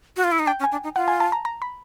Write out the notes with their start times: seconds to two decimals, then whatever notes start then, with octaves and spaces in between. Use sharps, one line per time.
0.17 F#4
0.24 F4
0.32 E4
0.39 D#4
0.46 D4 G5
0.59 C#4
0.64 G#5
0.72 D4
0.84 D#4
0.96 F4 F#5
1.08 G#5
1.20 A5
1.32 A#5
1.45 A#5
1.62 B5